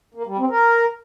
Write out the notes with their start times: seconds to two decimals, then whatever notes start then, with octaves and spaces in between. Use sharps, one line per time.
0.14 A#3
0.26 G3
0.38 C4
0.50 A#4